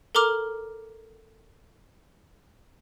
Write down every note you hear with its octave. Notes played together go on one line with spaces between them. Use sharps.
A4 A#4 A#5 D6 F6